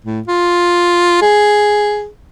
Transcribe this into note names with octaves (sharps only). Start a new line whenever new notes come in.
A2
F4
G#4